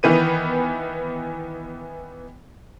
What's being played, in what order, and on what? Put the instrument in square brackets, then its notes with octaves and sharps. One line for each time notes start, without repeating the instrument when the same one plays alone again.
[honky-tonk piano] D#3 E3 B3 D#7